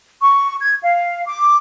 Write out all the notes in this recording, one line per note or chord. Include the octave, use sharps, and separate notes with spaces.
C#6
G#6
F5
D6